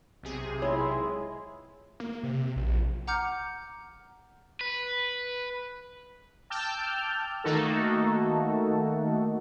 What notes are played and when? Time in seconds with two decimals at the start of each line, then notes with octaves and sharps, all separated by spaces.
0.23 B1 C3 G#4
0.62 G#3 E4 F4 C#5
2.00 A#3
2.23 C3
2.56 A#1
3.07 F#5 A#5 D6 F6 G6 C#7
4.61 B4
6.50 G5 A5 D6 E6 F6 G6
7.44 D#3 A3 A#3 D#4 F#4 A4